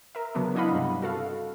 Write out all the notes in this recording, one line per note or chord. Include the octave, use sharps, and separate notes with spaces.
A#4 E5
C#3 F#3 B3 D4
D4 E4 D#5 F5 F#5 B5
G2 C3 G3
F#4 A4 F5